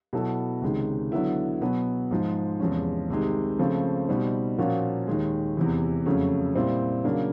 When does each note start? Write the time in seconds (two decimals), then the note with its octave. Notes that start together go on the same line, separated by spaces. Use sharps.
0.13 B2 F#3 B3 E4 A4
0.62 C#2 C3 D#3 G#3
1.12 D3 F#3 B3 E4
1.61 B2 F#3 B3
2.11 G#2 F3 G#3
2.60 E2 C3 F3 G#3 C#4
3.10 C2 C3 D#3 G#3
3.59 C#3 F3 A3 C4
4.09 B2 G3 C4 D#4
4.58 A#2 F3 A#3 C#4 F#4
5.07 D#2 D#3 G#3
5.57 E2 C3 E3
6.06 F2 C#3 F#3 A3 C#4
6.55 A#2 G3 C4 E4
7.04 C#3 F#3 A#3 D4